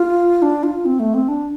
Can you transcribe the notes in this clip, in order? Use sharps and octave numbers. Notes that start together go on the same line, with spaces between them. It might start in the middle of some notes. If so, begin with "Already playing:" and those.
Already playing: F4
D4
F4
C4
A3
C4
D4